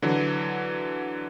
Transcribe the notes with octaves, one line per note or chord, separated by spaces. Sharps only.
D3 E3 F#3